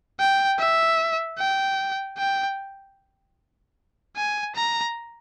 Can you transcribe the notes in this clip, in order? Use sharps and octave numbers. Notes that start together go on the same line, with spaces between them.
G5
E5
G5
G5
G#5
A#5